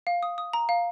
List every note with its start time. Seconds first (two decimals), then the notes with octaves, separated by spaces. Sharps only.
0.07 F5
0.23 D#6
0.38 D#6
0.53 A#5
0.69 F5